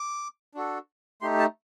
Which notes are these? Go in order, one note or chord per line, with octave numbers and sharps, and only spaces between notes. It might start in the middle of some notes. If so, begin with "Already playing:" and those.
Already playing: D6
D4 F#4 A4
A3 D#4 G4 C6
A5